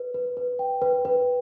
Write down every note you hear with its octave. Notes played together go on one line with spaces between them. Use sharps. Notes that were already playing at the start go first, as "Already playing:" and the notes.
Already playing: B4
B4
B4
G5
B4
B4